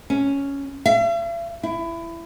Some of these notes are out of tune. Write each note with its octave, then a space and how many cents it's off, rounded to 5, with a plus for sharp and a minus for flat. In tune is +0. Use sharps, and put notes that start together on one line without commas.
C#4 +5
E5 +45
E4 +20